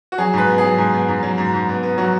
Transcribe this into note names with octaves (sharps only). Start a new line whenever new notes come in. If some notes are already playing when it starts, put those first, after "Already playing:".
F#4
F#3 G#4
G#2 B4
B3
G#4
F#3
G#2
B3
G#2
F#3
G#2
G#2
B3
B3
F#3 F#4